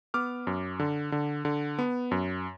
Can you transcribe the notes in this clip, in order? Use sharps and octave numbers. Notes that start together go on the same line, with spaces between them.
B3 D6 F6
F#2
D3
D3
D3
B3
F#2